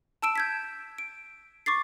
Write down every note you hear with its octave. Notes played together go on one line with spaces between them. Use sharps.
A5 E6 D7 E7
G6 G#6 B6
D7
C#6 D6 A6 C7